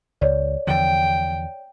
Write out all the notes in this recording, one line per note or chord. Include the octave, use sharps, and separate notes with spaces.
C#2 C#5 D5
E2 D3 F3 G5